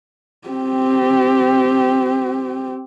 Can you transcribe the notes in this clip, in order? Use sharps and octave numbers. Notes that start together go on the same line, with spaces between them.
C4 G4